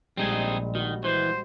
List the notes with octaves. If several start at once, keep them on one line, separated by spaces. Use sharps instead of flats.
A#1 G3 G#3 C4 D#4 G#4
D#3 F#4
E3 C5